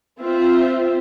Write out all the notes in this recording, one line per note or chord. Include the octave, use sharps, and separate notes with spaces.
C4 F4 C5 E5